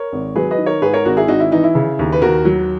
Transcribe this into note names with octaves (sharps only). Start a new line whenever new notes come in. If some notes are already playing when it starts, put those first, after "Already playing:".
Already playing: A#4 C#5
G#1
F#3 G#4 B4
B4 D#5
D#3
A#4 C#5
G#2 G#4 B4
A#4 C#5
G#1 F#4 A#4
E4 G#4
G#1 D#4 F#4
E4
E3 D#4
E4
C#3
D#2
B4
D#2 F#4 A#4
F#3